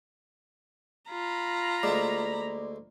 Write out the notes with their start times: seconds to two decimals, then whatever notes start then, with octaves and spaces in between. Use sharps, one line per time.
1.11 F4 A#5 B5
1.83 D2 G#3 A#3 D5 D6